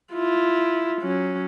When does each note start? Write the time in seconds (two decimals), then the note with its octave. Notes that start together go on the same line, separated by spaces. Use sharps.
0.13 E4 F4
1.02 F#3 C#4